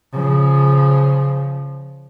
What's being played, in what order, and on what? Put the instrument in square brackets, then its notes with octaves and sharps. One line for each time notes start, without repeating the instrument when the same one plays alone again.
[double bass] C#3 F3